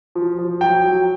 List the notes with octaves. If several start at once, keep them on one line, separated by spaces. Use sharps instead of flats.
F3
F3
F#3 G5
F#3